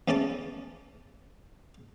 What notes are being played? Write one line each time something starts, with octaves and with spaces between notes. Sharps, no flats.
E2 A3 C#4 D5 A5 D6